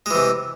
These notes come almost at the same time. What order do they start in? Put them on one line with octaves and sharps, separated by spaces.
G#3 E3 C3